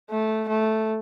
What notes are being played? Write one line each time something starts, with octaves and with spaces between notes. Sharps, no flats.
A3
A3